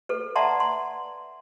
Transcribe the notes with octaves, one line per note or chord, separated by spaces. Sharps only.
A4 B4
D5 E5 F#5 A5 A#5 C6
C6